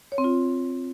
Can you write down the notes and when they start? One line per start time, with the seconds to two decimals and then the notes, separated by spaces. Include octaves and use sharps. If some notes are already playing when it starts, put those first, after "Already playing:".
0.12 C#5
0.18 C4
0.24 F4